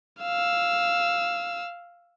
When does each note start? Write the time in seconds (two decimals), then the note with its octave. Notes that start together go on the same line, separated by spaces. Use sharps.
0.22 F5 E6